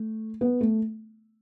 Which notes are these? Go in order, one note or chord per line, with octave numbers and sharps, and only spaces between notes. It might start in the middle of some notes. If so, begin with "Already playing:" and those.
Already playing: A3
B3
A3